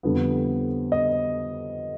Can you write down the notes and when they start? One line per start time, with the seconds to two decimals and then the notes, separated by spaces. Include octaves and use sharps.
0.03 F2 D3 G3 B3
0.92 D#5